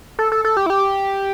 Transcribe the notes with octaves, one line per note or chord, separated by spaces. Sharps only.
A4
A4
A4
G4
E4
G4